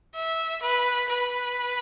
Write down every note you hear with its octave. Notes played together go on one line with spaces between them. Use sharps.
E5
B4
B4